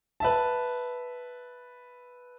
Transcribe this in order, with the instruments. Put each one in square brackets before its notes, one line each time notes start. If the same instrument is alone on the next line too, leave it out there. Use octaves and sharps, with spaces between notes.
[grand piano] B4 E5 A5